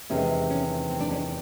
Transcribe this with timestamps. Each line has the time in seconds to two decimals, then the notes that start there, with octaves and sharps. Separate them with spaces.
0.10 E2 C3 D#3 G#3 C#4
0.50 C#4
0.90 C4
1.00 D4
1.11 C#4